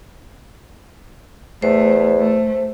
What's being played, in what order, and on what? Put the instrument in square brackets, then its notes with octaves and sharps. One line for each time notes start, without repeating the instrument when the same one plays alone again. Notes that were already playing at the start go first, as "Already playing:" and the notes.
[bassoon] E2 [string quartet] A3 [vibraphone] C5
[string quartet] A3